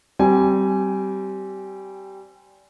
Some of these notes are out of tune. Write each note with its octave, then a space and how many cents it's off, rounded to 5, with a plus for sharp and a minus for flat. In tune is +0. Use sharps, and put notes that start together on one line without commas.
G3 -20 C4 +0 G#5 +0